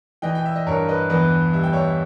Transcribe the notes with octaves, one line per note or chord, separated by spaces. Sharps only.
E3 D#5 G5
G5
E5
D#5
G2 A#4 C#5
B4 D#5
E2 B4 D#5
G3 E5
G5
C#5 E5